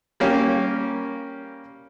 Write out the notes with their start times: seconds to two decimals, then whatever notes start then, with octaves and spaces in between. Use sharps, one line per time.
0.20 G3 A#3 C#4 G4